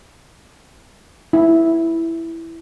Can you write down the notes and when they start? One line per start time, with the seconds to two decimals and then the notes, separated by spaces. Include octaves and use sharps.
1.33 E4